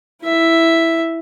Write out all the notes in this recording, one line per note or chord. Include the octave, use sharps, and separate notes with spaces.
E4 E5